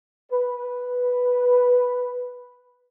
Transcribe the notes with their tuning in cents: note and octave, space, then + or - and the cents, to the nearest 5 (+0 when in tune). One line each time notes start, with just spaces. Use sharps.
B4 +0